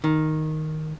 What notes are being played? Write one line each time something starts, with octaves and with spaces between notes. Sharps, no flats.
D#3